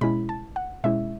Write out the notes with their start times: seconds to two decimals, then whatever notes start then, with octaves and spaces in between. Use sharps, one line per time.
0.01 B2 G#3 C#4 E4 B5
0.29 A5
0.56 F#5
0.84 B2 G#3 C#4 E4 E5